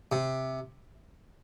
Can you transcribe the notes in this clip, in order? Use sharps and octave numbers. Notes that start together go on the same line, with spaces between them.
C3